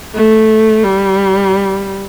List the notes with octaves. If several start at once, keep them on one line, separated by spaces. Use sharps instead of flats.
A3
G3